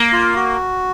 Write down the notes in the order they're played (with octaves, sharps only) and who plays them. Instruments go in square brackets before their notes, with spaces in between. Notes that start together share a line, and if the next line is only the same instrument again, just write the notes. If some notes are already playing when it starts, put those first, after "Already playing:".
Already playing: [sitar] A#3
[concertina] F4
F#4